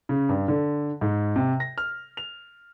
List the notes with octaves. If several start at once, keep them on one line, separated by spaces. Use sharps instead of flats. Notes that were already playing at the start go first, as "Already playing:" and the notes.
C#3
G2
D3
G#2
C3
A#6
F6
F7